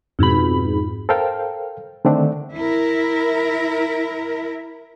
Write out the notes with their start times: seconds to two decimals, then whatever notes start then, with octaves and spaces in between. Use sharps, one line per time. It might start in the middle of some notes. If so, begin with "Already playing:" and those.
0.19 F2 G#2 B2 B5
1.09 A4 A#4 C5 F5 G5
2.05 D3 D#3 A3 C4 D4
2.54 E4 A#4